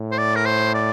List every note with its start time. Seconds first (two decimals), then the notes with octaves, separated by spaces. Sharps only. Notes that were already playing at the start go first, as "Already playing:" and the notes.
Already playing: A2
0.11 C5
0.18 D5
0.35 A#4
0.46 C5
0.74 D5